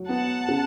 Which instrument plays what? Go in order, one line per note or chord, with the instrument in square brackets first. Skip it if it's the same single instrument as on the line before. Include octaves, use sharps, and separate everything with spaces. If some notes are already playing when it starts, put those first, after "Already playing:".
Already playing: [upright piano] F#3
[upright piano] B3 [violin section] F#5 A5
[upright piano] C#3